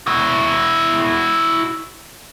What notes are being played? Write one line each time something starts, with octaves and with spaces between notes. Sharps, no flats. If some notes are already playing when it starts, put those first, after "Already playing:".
E4 F#4